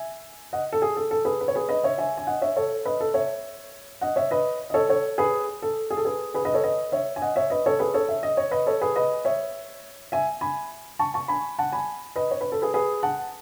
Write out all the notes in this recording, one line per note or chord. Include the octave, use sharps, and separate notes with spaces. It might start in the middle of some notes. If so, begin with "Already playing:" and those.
Already playing: E5 G#5
D#5 F#5
A4
G#4
A4
A4
G#4 B4
B4
C#5
G#4 B4
B4 D#5
C#5 E5
E5 G#5
G#5
D#5 F#5
C#5 E5
A4 C#5
B4 D#5
A4
C#5 E5
D#5 F#5
C#5 E5
B4 D#5
D#5
A4 C#5
A4 C#5
G#4 B4
A4
G#4
A4
G#4 B4
G#4 B4
B4 D#5
A4 C#5
B4 D#5
C#5 E5
G#5
D#5 F#5
C#5 E5
B4 D#5
A4 C#5
G#4 B4
A4 C#5
E5
D#5
C#5
B4 D#5
A4 C#5
G#4 B4
B4 D#5
C#5 E5
E5 G#5
G#5 B5
A5 C#6
A5 C#6
G#5 B5
F#5 A5
G#5 B5
B4 D#5
C#5
B4
A4
G#4 B4
G#4 B4
F#5 A5